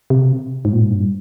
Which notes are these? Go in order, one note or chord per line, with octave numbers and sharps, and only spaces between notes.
C3
G#2
A#2
G#2
G2